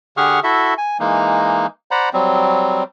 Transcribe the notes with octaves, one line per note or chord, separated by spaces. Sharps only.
D3 G4 G#4 F#5 C#6 F6
E4 F#4 A4 E5
G#5
E3 G#3 A#3 D#4
C5 D5 F#5 A#5 B5
F#3 G3 C4